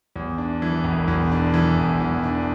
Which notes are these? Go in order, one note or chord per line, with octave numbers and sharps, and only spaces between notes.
E2
D4
E3
E1
E2
D4
E3
E1
E2
D4